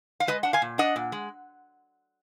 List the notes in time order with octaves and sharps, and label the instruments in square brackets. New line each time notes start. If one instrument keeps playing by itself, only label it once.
[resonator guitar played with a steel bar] F5
G#3 B4 D#5
D4 F#5
F5 G#5
A#2
D4 D#5 F#5
A#2
G#3